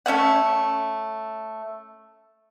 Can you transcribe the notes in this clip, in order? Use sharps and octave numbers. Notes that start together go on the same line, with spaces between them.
A3 C#4 E5 F#5